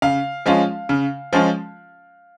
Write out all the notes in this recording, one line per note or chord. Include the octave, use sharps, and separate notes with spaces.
C#3 F5
F3 G#3 C#4 F4
C#3
F3 G#3 C#4 F4